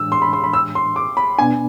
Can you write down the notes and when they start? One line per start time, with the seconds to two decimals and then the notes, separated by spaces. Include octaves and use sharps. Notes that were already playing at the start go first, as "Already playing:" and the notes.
Already playing: A2 E3 G#3 D4 E6
0.12 C6
0.22 B5
0.33 C6
0.44 B5
0.53 E6
0.75 C6
0.96 D6
1.17 B5
1.39 B2 B3 D4 G#5